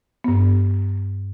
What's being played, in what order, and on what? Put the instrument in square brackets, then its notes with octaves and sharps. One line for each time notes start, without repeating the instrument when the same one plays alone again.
[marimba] G2 B3